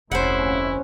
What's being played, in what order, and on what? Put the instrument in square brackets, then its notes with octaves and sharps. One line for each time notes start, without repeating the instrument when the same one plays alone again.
[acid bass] F1 [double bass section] D2 C3 C#4 [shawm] E4 [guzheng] C5 F#5